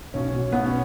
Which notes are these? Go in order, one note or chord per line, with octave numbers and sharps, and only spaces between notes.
B1 C#4
B2
B1 B3
C#4